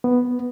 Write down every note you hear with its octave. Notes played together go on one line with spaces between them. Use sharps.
B3